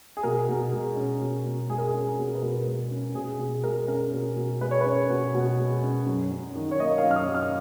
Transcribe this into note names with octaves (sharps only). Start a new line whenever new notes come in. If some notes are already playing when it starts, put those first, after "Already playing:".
G#4
B2 A#4
B2
G#3
C#4
B2
B2
G#3 G#4
A#4
G#4
C#4
B2
B4
B2 A#4
G#3
C#4
B2 G#4
B2 G#4
G#3 A#4
C#4 A#4
B2
B2
G#3 B4
C#5
C#4 B4
B2
B2
G#3
C#4
F#2
F#2
D#3
C#5
A#3 D#5
F5
F#2
F6
D#6
F#2
F6